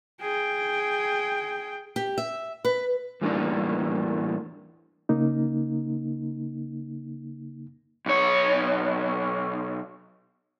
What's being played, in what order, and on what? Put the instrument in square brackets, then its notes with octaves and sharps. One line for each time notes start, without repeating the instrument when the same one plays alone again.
[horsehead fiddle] G#4 G5
[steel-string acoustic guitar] G4
E5
B4
[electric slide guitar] E2 A2 G3 A#3 D4 D#4
[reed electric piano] C#3 A#3 D#4
[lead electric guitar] B1 C#5